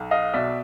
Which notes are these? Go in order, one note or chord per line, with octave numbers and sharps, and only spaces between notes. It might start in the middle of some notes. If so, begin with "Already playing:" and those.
Already playing: B1
D#5 F5
B2 D5 E5